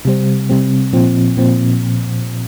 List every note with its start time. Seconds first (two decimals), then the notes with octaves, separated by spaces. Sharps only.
0.05 C3 G3 C4
0.49 C3 G3 C4
0.93 A#2 F3 C4
1.37 A#2 F3 C4